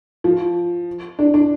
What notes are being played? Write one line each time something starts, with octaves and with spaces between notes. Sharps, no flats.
F3
D4
D4